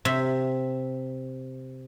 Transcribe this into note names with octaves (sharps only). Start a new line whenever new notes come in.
C3 E5